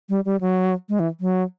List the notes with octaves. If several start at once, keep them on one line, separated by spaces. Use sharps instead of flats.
G3
G3
F#3
G#3
E3
F#3